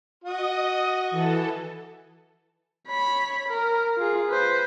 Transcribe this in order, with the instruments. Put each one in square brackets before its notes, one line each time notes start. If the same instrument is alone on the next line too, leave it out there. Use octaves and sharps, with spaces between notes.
[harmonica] F#4 [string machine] D#5 D#6
[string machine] E3 A4
[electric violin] C#5 B5
A#4
F4 G#4
B4 C5